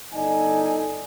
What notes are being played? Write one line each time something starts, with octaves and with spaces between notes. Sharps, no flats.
G1 D#4 A4 D5 D#5 G#5